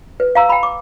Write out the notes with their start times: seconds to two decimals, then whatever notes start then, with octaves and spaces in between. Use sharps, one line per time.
0.20 B4
0.35 F5 A#5 E6
0.49 G5 B5
0.63 D6